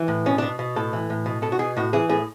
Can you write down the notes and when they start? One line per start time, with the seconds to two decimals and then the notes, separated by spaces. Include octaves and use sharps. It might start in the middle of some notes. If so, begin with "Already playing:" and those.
Already playing: E3
0.08 A2
0.26 B2 C#4
0.38 D4
0.43 B2
0.59 B2
0.76 A2 A4
0.93 E3
1.10 A2
1.26 B2
1.42 B2 A4
1.52 F#4
1.59 B2 G#4
1.77 A2 F#4
1.93 E3 G#4
2.09 A2 G#4